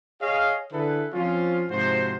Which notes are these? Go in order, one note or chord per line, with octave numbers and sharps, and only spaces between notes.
G#4 C#5 D#5 F5
D3 E4 G#4 A4 B4
F3 C4 C#4 F4
G#2 C3 F3 F#4 C5